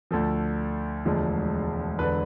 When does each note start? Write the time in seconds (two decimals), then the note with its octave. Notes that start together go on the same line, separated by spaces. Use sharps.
0.11 D2 D3 F3 A4
1.05 E1 D2 D3 F3 G#3
1.99 E1 D3 B4